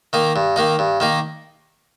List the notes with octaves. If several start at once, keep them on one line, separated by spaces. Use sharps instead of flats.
D#3 A#3 D#4
G2
D#3 A#3 D#4
G2
D#3 A#3 D#4